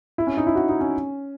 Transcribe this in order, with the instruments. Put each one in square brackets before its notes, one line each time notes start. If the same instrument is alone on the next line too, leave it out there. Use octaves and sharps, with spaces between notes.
[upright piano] E4
C#4
D#4
E4
F#4
D#4
C#4